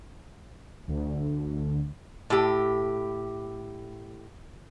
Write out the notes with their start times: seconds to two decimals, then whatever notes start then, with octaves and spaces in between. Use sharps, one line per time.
0.88 D2 D3
2.30 A2 G4